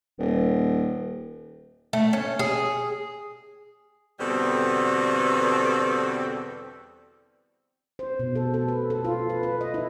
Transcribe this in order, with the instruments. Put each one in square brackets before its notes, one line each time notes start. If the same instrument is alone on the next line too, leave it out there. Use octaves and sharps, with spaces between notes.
[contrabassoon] D#1
[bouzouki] A3
C#4
G#4
[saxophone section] E2 B2 D3 G3 C4 A4
[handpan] C5
B2
A4
A4
B4
A4
F4
B4
B4
D#5
E4